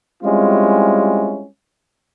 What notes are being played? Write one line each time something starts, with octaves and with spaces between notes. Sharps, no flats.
G3 G#3 C4 C#4 E4 F4